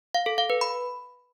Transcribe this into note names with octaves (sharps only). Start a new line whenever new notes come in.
F5
A4
F5
B4
B5